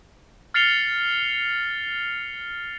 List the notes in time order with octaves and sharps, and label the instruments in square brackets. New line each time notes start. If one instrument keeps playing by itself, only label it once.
[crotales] F6 A6 C7 C#7 F7 G7